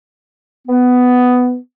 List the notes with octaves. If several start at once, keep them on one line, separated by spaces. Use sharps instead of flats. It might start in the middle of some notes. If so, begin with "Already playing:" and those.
B3